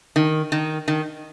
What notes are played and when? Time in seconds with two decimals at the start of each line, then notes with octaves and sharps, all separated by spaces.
0.16 D#3
0.52 D#3
0.88 D#3